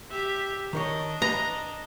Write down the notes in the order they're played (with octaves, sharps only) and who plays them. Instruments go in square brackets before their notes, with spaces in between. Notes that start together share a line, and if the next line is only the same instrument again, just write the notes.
[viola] G4 E5
[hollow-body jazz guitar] D#3 A#4 C#5 [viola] D4 D#5
[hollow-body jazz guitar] B4 [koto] A#5